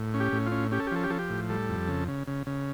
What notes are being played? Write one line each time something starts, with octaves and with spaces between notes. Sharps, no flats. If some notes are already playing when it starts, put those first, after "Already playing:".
Already playing: A2
C#4
G4
A2
F4
C#4
C#4 G4
A4
G4
F3 A4
G4
F3 A4
G4
A2
G3 A4
F2
C#3
C#3
C#3
C#3